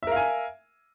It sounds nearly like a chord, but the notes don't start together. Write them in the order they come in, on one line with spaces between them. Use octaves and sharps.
E5 A#4 F5 G#5